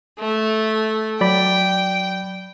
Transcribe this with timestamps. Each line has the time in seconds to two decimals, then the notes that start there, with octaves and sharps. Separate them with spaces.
0.19 A3
1.21 F#3 D5 G5 B5